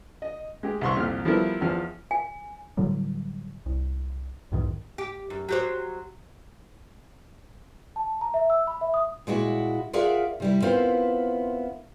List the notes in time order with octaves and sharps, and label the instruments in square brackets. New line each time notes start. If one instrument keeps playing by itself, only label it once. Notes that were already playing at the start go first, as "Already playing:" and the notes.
[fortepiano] D#5
G#3 G4
C2 C6 C#6
C2 F2 A#2 G4 F6
F3 G3 B3 E4 A4 A#4
E2 F3 F6
[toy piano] G#5
[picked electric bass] A2 D3 F#3 G3
C2
B1 E2 G#2 D#3
[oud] G4
F#2
F#3 G4 C5
[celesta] A5
A#5
E5
E6
B5
E5
D#6
[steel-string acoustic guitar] A#2 G#3 E4 F#4
F4 G#4 A#4 D5 E5 F#5
C3 G3 E4
B3 C4 E4 F4 A#4 C5